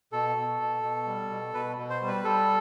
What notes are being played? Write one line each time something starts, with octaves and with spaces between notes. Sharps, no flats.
B2 A4
B2
B2
B2
G3
B2
B2 B4
B2
C5
G3
B4
G3 A4